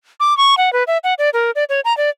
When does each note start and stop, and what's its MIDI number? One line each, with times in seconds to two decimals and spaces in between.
0.20 0.36 86
0.37 0.55 85
0.58 0.72 78
0.73 0.84 71
0.87 0.98 76
1.04 1.14 78
1.19 1.30 74
1.33 1.51 70
1.55 1.64 74
1.69 1.81 73
1.85 1.96 82
1.97 2.10 74